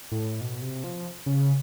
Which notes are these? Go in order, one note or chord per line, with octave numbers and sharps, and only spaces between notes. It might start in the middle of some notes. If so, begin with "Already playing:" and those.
A2
B2
C3
F3
C#3